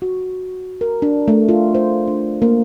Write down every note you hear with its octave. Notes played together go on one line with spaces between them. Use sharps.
F#4
A#4
D4
A3
F4
C5
D4
A#3